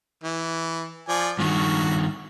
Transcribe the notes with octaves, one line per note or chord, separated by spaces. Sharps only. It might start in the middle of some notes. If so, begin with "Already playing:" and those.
E3
F3 D5 G#5
G2 D#3 F#4